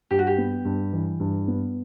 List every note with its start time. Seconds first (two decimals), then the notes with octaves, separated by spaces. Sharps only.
0.11 G2 G4
0.19 F#4
0.27 G4
0.38 B3
0.65 G2
0.93 E3
1.20 G2
1.48 B3